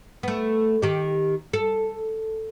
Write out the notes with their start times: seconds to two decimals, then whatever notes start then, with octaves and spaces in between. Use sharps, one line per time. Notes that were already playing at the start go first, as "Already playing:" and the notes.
0.23 A3 B3
0.82 D#3 G4
1.53 A4